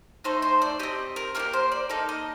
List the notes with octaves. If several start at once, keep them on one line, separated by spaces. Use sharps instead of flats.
A3 D#4 A4 C5
C5
D5
C4 G4 D#5
A#4
A#3 D#4 G4 A#4
C5
D5
A#3 D#4 A4
D#5